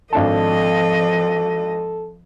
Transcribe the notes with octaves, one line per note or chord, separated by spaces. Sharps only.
G#1 F3 D4 A4 D#5 A5